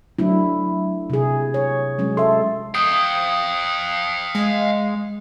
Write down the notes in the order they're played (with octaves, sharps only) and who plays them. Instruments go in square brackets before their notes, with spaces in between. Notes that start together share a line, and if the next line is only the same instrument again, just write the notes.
[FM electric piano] F#3 [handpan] A3 D4 E4
[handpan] C3 G#4
C#5
F#3 G#3 C#4
[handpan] A4 [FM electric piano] E5 C6
[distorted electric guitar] F5 G5 [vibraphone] D#6
[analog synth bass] G#3